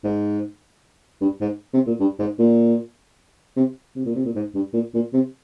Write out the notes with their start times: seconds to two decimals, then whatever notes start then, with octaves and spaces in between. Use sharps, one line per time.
0.04 G#2
1.21 G2
1.41 G#2
1.74 C3
1.87 A#2
2.00 G2
2.19 G#2
2.39 A#2
3.56 C3
3.96 C3
4.05 A#2
4.15 C3
4.25 A#2
4.35 G#2
4.54 G2
4.74 A#2
4.94 A#2
5.13 C3